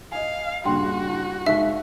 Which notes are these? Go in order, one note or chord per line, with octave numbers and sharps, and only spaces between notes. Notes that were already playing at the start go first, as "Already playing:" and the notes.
D#5 F5 G#5
G2 A#2 C#3 D4 F#4 G5 C6
E4
F1 G#3 D#4 E5 F5 C#6 E6